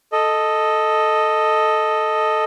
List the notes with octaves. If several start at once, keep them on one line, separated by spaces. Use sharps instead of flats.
A4 D#5